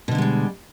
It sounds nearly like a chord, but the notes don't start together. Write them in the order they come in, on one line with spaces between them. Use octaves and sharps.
B2 D3 A#3 G#3 G3